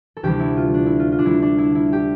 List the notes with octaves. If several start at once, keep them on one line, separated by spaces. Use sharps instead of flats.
A4
D2 C3 E3 G3 G4
E4
F4
D4
E4
F4
F4
D4
D2 D3 G3 E4
D4
E4
E4
G4